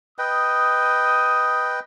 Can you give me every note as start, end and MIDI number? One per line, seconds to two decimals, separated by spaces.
0.19 1.80 71
0.19 1.80 75
0.19 1.80 79
0.19 1.76 87